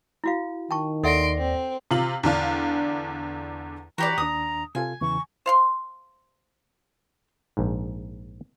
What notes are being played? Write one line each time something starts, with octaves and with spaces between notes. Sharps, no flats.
E4 F#4 F5
D#3 G5 A5 C#6
D#2 A4 D5 E5 F#5 C6 A#6 D7
C4
C3 F4 F#7
E2 D3 D4 F5
E3 F#4 G4 D5 G5 A#5 B5
D#2 D4 D#6
C3 F4 A4 G#5
E2 C#3 E3 C#6
C5 F5 C6
A#1 G#2